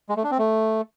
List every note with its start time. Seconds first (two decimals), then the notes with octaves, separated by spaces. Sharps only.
0.09 G#3
0.16 A3
0.24 D4
0.31 C4
0.38 A3